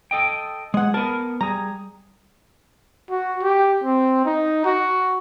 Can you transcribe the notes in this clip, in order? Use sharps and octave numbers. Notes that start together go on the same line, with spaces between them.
A4 D#5 G5
G#3 G#4 F#5
B3 A#4 A5
G3 G#4 A#5
F#4
G4
C4
D#4
F#4